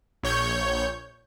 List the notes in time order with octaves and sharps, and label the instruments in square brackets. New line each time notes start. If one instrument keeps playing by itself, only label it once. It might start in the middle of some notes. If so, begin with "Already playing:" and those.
[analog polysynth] A#1 C#5 G6